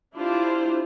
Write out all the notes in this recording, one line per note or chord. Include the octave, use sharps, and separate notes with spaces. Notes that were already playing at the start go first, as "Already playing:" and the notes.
D4 E4 F4 G4 C5